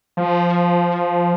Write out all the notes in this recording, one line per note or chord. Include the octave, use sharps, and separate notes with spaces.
F3